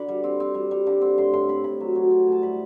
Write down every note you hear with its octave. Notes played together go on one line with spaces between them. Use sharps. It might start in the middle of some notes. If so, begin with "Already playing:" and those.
Already playing: D3 B5 D6
G3
C4
C4
G3
G3
D3
C4
A2 C6
A2 C6
C4 B5
A2 B5
F#3
F#3
C4
A2 A5
G3 B5